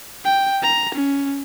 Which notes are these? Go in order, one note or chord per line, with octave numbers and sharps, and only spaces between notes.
G5
A#5
C#4